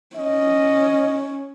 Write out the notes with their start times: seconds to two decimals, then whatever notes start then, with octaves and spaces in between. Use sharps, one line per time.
0.16 C#4 D#5